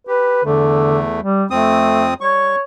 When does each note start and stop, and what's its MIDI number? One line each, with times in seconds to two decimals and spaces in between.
0.07 0.41 67
0.07 0.45 71
0.45 1.21 40
0.45 1.03 50
0.45 1.21 57
1.21 1.45 55
1.50 2.14 41
1.50 2.09 57
1.50 2.14 60
1.50 2.14 87
2.21 2.56 55
2.21 2.62 73
2.21 2.56 85